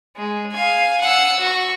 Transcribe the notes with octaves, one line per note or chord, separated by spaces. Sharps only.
G#3
F5 G#5
F#5 E6
F#4 C#6